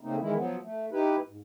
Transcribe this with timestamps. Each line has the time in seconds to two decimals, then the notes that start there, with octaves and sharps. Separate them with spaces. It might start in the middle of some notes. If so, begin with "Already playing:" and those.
0.01 C#3 A3 A#3 C4 D#4
0.20 D#3 E3 G#3 E4
0.36 F3 F#3 B3
0.62 A3
0.92 D#4 E4 G4 B4
1.27 G#2